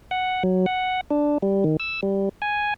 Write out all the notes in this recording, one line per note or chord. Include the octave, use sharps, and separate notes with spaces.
F#5
F#3
F#5
D4
G3
D#3
E6
G3
G#5